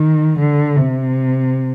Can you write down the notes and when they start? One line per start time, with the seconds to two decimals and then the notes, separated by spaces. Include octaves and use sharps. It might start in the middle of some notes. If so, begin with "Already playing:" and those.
Already playing: D#3
0.39 D3
0.76 C3